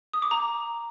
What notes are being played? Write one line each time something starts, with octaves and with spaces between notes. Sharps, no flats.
D#6
D6
A#5